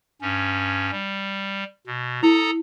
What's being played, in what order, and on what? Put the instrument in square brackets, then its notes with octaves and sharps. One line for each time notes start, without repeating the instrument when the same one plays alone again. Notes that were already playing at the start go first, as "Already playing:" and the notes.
[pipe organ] G2 C#4
G3
B2
[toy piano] E4 [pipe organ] A4 A#5 D#6